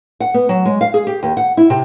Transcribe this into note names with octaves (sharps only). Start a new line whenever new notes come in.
F#5
B3
F#3
G#3
F5
G#4
G4
D#2
F#5
E4
C3